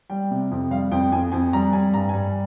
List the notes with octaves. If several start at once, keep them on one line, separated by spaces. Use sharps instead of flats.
G3 G5
C3
F2
G3 F5
F2 G5
F2 G#5
F2 G#5
G3 A#5
G3 G#5
G2 A#5
G#5
G3